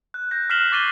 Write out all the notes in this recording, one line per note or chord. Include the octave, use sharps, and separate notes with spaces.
F#6
G6 A#6
F6 B6 C7 E7 F#7 G7
C#6 D6 A6 C7 D#7 G7